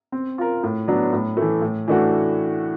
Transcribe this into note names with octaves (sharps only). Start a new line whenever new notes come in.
C4
F4 A#4
A2
F#3 B3 D4
A2
E3 A3
A2
E3 A3 D4 F#4